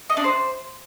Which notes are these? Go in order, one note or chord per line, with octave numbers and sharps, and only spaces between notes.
D#5
D4
C5